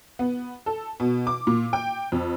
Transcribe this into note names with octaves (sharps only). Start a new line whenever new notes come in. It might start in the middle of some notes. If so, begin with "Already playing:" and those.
B3
A4
B2
D6
A#2
G5
F2